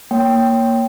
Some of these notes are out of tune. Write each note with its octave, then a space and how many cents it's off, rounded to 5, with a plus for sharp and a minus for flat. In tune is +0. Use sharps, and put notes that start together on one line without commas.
A#3 +0 C#5 +0 G5 +0